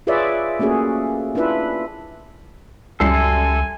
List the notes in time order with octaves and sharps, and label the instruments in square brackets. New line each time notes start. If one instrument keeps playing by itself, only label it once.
[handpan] F4 G#4 B4 C#5 D5 E5
A3 A#3 C#4 F#4 G#4
D4 E4 F4 B4 E5
[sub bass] C#2 [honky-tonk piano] F#2 G3 C7 [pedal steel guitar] A4 [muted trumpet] G#5